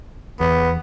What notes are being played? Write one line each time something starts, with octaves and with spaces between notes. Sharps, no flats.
E2 B3